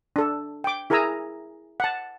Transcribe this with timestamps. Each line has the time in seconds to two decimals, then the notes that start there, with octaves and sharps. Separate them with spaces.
0.16 D4 A4
0.64 G5 D6
0.90 E4 G#4 A#4 G#5 A#5 E6
1.80 F#5 A5